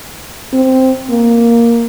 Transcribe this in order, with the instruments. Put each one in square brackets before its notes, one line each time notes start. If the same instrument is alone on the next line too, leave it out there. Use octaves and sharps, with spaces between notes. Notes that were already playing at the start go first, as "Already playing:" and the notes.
[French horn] C4
A#3